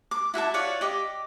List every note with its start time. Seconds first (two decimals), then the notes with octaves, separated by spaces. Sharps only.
0.11 D6
0.34 E4 F#4 E5 A5
0.54 F4 C#5 D5 F#5
0.81 G4 D#5 D6